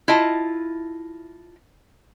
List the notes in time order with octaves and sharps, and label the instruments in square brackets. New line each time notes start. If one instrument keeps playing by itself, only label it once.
[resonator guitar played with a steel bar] E4 F4 D#5 A5